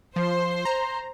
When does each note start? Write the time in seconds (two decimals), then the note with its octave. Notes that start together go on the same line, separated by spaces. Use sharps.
0.16 F3 C5
0.65 A#5